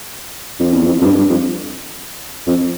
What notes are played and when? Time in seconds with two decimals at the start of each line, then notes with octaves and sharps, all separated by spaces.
0.60 F2
0.73 E2
0.86 F2
1.01 F2
1.06 G2
1.18 G2
1.30 F2
2.47 F2